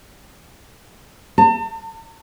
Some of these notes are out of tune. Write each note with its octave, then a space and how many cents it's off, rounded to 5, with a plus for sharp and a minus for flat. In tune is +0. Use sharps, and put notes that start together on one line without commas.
A5 +40